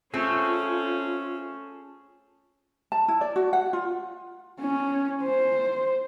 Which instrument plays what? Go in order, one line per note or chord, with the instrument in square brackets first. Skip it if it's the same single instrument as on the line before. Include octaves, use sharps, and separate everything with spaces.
[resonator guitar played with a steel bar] A3 C4 [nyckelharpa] C#4 [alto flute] F4 [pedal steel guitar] G#4 A4 C#5
[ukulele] A5
E4
D5
F#4
F#5
F4
[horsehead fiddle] C#4
C5